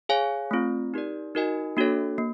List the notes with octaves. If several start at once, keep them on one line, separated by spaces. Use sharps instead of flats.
G#4 C#5 F5 G#5
A3 C4 F4
D#4 G4 A#4 D5
D#4 F#4 A#4 D#5 G#5
A#3 D4 F#4 A4 C#5
A#3